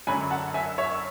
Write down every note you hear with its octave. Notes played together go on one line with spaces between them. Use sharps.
F#2 D3 F#3 C#4 G#5 B5
F#5 A5
E5 G#5
C#5 E5